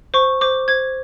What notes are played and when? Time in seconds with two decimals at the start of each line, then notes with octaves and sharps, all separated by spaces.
0.14 C5 C#6
0.41 C5 D6
0.68 C5 G#6